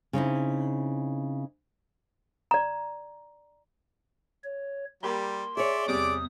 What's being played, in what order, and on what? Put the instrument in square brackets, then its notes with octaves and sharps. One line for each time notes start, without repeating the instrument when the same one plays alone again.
[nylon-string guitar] C#3 C4 D#4 E4
[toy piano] D5 A#5
[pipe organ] C#5
[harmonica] G3 [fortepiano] A#3 G4 B5 [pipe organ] C6
[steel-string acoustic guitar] G#4 C#5 [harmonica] D5 E5
[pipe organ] E2 D#6 [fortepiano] C3 G3 [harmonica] D5 D6